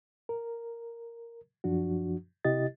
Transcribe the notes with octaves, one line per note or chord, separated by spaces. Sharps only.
A#4
F#2 F3 D4 F#4
C3 E4 G4 D#5 A6